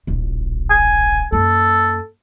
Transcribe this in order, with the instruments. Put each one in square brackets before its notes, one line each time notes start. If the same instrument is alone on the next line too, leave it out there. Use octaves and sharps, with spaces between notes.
[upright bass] D1 A#1
[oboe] G#5
[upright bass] F#2 A#3 [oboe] A4